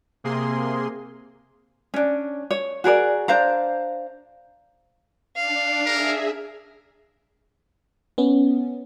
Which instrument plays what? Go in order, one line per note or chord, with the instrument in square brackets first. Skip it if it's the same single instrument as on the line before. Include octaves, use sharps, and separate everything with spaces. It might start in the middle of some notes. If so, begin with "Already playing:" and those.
[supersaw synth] C3 A#3 G#4 C6
[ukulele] C#4 D4
C#5
F#4 G#4 A#4 D5
D4 C5 F5 A#5
[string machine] D4 [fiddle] F5
[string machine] G#4 E5 [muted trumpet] A#4
[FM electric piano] B3 C#4